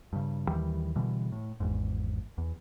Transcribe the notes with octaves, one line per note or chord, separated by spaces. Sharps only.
G2 C#3
D#2 D#3 E3 G3
B2 D3 E3 G3
A2
G#1 E2 G#2
E2